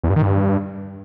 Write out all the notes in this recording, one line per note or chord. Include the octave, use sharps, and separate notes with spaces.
E2
G2
D#3
G2